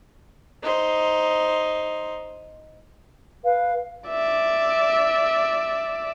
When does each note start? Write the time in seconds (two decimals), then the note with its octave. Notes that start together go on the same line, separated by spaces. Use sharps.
0.62 D#4 C5
3.45 B4 F5
4.09 D5 E5